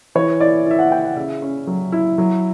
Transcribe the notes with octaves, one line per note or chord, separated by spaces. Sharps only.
E3 C#5
E4 D5
E4 E5
F#5
E4 G5
F#5
C#3 E5
C#4
F#3
E4
F#3